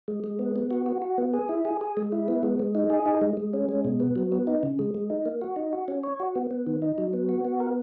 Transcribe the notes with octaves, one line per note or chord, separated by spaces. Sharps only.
G#3
G#3
B3
B3
F#4
F#4
F#4
B3
G#4
E4
G#4
G#4
G#3
E4
B3
G#3
G#3
D#4
G#4
D#4
G#3
G#3
C#4
G#3
B2
B3
F#3
B3
D#4
C#3
G#3
G#3
D#4
A#3
F#4
D#4
F#4
C#4
C#5
F#4
B3
B3
D#3
D#4
F#3
B3
F#4
B3
A#4